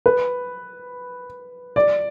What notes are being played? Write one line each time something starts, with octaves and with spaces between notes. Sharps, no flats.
B4
D5